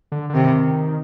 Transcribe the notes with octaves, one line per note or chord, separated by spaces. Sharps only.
D3
D3
C3 D#3